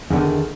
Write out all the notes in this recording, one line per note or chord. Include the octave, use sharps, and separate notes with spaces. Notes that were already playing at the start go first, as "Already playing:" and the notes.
E2 D3 D#3